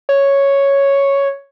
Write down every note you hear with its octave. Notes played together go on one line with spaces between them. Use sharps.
C#5